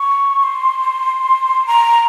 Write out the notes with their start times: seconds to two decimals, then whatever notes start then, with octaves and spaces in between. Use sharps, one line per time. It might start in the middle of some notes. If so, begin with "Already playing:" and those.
Already playing: C#6
0.43 C6
1.67 A#5